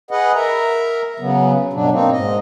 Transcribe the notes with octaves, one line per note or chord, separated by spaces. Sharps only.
G#4 B4 D#5 F#5
A#4 E5 A#5
C#3 F#3 B3
G2 B2 F#3 D4
A#3 C4 D#4
G#2 D#5